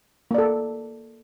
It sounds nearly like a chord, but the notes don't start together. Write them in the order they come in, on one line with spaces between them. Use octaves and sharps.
A#3 D5 A4